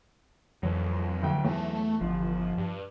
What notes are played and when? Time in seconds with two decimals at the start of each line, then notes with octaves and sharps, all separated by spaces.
0.63 F2 E3 F#3
1.23 D2 G5
1.45 E2 A3
2.01 G1 F3
2.58 G2